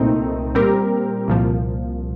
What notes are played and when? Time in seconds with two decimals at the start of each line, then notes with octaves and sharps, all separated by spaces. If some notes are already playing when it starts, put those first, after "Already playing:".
Already playing: C2 A#2 A3 C4 D#4
0.55 A#2 G3 C4 G4 A#4
1.28 C2 A#2 F3